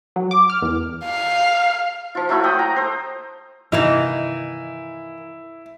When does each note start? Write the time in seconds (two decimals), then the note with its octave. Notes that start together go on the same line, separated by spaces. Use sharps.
0.16 F#3
0.31 D6
0.50 F6
0.62 E2
1.05 F5
2.15 F3 F4
2.29 F#3 A3 E4 F4
2.44 F#5 G5 B5 D#6
2.59 A#5
2.76 A4 C5
3.72 G2 C3 D#3 E3 A#3 D#4 E4